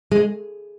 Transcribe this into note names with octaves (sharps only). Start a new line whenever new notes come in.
G#3